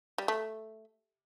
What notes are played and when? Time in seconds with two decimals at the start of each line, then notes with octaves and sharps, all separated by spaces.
0.18 G3
0.28 A3